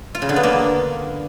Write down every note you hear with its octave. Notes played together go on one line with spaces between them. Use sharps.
F4
C#3
D3
B3
A#3